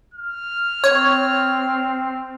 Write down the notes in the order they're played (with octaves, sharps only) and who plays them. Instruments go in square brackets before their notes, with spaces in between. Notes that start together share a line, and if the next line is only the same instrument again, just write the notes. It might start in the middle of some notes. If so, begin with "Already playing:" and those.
[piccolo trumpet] F6
[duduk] C4 [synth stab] C#5